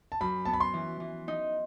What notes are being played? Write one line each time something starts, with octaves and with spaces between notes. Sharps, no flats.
A5
F#2 B5
B3 A5
B5
C6
E3
E3
D#4